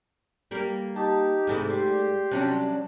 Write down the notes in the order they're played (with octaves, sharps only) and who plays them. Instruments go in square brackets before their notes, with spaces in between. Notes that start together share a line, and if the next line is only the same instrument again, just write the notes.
[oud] G3 A#3 A#4
[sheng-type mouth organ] D#4 G4 [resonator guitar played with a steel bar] A5
[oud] G#2 A3 E4 [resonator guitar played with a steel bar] C3 E3 G#5
[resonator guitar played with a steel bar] G3 [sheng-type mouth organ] G4 C6
[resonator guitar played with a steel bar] C3 D4 [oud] F#3 G3 C#4